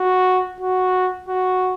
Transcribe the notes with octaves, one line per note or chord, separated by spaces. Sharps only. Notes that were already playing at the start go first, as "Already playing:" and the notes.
Already playing: F#4
F#4
F#4